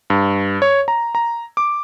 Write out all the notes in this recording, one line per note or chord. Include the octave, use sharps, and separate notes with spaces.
G2
C#5
A#5
A#5
D6